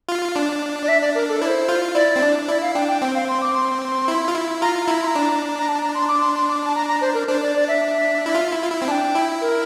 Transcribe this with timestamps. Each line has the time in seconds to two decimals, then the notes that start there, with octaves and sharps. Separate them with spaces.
0.09 F4
0.36 D4
0.83 D5
0.88 E5
1.01 D5
1.15 A#4
1.29 A4
1.41 E4 C5 D5
1.69 F4
1.95 E4 D5
2.16 C4
2.22 D4
2.48 E4 D5
2.62 F5
2.75 D4 G5
2.88 G5
3.01 C4 G5
3.15 F5
3.29 C6
3.42 D6
3.55 C6
4.08 E4
4.28 F4
4.34 E4
4.62 F4 A#5
4.88 E4 A#5
5.02 C6
5.06 A#5
5.15 D4
5.59 A#5
5.68 A5
5.82 A#5
5.95 C6
6.08 D6
6.21 C6
6.35 C6
6.48 D6
6.66 A5
6.75 A#5
6.88 A#5
7.01 C5
7.14 A#4
7.28 D4 C5
7.42 D5
7.55 D5
7.68 E5
8.26 E4
8.35 F4
8.52 E4
8.62 F4
8.71 E4
8.82 C4
8.87 D4 G5 A5
9.15 E4
9.41 A#4